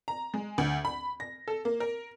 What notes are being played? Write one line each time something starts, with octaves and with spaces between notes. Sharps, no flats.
A#5
G#3
D2
B5
A#6
A4
A#3
A#4